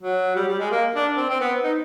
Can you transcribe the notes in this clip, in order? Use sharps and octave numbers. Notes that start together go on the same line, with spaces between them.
F#3
G3
G3
G#3
A#3
D4
C4
C4
B3
D#4